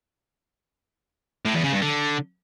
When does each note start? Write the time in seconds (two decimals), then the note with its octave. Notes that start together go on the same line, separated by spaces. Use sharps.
1.46 A2
1.55 E2
1.64 C#3
1.73 G2
1.82 D3